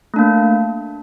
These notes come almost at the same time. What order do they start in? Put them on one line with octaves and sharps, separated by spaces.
A3 D4 A#3